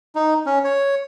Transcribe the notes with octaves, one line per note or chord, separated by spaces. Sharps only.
D#4
C#4
C#5